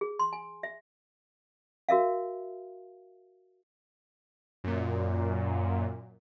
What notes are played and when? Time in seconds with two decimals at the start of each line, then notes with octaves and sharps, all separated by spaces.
0.01 G#4
0.19 C6
0.33 G#5
0.63 E5
1.89 F#4 A#4 E5 F5
4.64 F#2 A#2